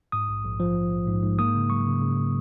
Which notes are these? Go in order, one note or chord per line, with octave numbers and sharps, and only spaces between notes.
G#2 D#6
A#1
A#1
F3
A#1
A#1
G#2
G#2
A#3 D#6
C#3
F#3 C#6
C#3
C#3
C#3